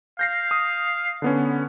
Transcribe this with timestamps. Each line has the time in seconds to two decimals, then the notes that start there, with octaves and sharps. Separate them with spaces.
0.19 F5 G6 A#6 C7
0.51 D#6
1.22 D3 B3 C#4